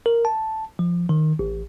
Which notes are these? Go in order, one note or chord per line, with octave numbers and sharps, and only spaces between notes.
A#4
A5
F3
D#3
A1